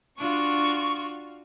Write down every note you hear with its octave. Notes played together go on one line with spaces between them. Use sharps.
D4 F4 F#4 C#6